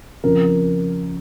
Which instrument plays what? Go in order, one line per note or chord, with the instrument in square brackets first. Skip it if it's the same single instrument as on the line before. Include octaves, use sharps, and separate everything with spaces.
[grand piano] F2 C#3 F3 A#4